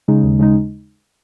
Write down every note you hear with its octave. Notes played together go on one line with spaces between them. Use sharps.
C#3 G#3 D#4
D#2
C#3 G#3 D#4